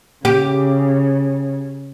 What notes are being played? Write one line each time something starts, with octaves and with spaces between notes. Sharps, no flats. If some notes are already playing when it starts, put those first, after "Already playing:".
C#3 G4